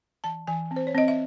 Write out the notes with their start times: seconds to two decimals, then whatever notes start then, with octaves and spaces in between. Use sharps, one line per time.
0.24 E3 A5
0.47 E3 G#5
0.71 C4
0.76 C5
0.87 C#5
0.95 C4 D#5
1.08 E5